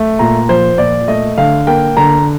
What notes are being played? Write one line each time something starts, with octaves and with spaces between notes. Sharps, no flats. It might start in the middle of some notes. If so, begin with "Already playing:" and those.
Already playing: A3
A#2 A#5
F3 C5
A#2 D5
A3 D#5
D3 F5
A#3 G5
D3 A#5